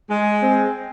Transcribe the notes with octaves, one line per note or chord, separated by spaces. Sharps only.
G#3
C4